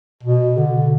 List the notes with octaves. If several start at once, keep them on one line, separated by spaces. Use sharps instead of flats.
B2
D3